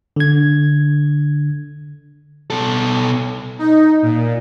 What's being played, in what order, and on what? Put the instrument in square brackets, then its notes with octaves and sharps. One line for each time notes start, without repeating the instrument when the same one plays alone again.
[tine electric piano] D3 G#6
[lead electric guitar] B2 A4
[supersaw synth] D#4
A#2